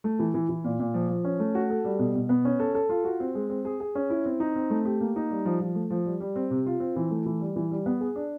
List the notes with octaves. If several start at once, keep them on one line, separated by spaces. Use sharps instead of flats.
A3
E3
E3
E3
A#2
A#2
F3
F3
C#4
A3
F#4
A4
G3
B2
B2
B3
C#4
A4
A4
F4
F#4
C4
G#3
C4
G#4
G#4
C#4
E4
C4
D#4
C4
A3
G4
A#3
D#4
G3
F3
F3
A3
F3
G3
G3
C4
C3
F4
C4
E3
A3
E3
G3
E3
G3
B3
G#4
D4